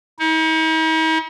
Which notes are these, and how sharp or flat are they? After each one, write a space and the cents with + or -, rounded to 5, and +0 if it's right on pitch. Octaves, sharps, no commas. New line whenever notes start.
D#4 +45